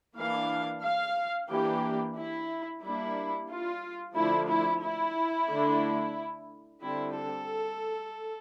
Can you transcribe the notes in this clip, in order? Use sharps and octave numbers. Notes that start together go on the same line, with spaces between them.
E3 A#3 D4 F5
F5
E3 A#3 D4 G4
E4
G3 A#3 D4 E4
F4
D3 F3 A3 D4 E4
E4
E4
D3 A3 D4
D3 G3 C4 E4
A4